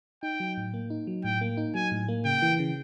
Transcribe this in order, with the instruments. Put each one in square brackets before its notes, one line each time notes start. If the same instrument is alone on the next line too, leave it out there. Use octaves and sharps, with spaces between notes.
[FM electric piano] D#4 [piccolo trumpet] G5
[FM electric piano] F#3
A2
A#3
D#4
F#3
[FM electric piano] A2 [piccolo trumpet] G5
[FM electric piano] A#3
D#4
[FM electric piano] F#3 [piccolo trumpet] G#5
[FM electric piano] A2
A#3
[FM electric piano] C#3 [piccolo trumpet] G5
[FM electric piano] E3
C#3